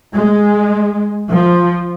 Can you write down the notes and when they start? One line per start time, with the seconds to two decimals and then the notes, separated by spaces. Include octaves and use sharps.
0.14 G#3
1.29 F3